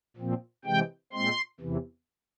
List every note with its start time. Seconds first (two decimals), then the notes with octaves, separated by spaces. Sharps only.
0.17 A#2 F3 C4
0.65 C3 E3 G#3 G5
1.13 A#2 G#3 C4 C6
1.60 E2 C3 E3